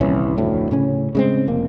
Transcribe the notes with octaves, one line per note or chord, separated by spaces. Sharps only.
D#1 C2 E3 C#4
F1 D2 A2
A2 C#3 C#4
C#3 G#3 C4
F1 A#3